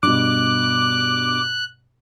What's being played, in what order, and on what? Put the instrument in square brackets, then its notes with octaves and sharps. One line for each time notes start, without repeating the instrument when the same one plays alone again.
[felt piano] G2 B2 [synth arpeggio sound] D6 [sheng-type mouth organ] F#6